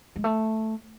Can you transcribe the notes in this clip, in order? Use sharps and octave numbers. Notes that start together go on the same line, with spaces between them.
G#3
A3